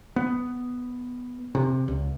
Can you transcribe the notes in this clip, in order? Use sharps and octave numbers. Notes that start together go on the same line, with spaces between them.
B3
C3
C#2